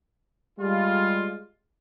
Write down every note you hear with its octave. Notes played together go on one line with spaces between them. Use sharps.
G3 G#3 F4